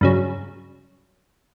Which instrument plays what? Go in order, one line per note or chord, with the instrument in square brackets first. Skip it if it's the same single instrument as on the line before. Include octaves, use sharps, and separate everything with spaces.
[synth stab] G2 C#3 F#3